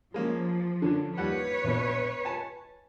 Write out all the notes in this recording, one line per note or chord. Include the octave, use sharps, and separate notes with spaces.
F3 G#3 A#3 C#4
D3 C#4 D4
D#2 G3 B4 C#5 F#5
A#1 B2
G#5 A5